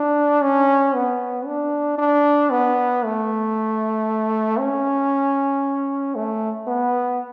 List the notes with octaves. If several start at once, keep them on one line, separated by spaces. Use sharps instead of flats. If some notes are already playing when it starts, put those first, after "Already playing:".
Already playing: D4
C#4
B3
D4
D4
B3
A3
C#4
A3
B3